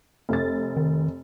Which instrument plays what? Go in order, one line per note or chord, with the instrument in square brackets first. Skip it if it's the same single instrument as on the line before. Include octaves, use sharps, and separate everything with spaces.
[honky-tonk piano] F1 A6
[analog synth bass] D#3